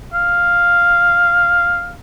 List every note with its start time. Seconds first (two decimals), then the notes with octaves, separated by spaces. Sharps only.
0.14 F5